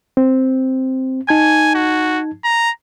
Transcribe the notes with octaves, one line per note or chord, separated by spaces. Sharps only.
C4
D#4 G#5 A5 G#6
F#4
A#5